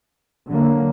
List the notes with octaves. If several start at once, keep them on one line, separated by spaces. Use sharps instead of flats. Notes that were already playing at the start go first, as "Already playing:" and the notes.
D3 F#3 A#3